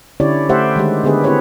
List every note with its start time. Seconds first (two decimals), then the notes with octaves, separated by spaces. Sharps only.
0.20 D3 C#4 E4 G4 C#5 D5
0.49 A3 G4 C5 E5 F#5
0.76 D#3 G#3 G4
1.03 D3 B3 G4 G#4 B4
1.24 C4 E4 G4 B4 C#5